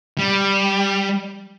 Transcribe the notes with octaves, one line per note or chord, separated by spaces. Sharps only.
G3